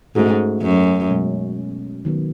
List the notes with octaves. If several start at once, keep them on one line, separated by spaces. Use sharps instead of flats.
G#2 A3 C#4 F#4 A4
F#2
B2 G#3 C#4
D#3 F#3 B3